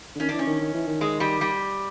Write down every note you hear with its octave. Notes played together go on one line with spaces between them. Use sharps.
D3
D#3 C#4
E3 D4
C#4
D#3
D#3
E3
D#3
G#3
G3
G3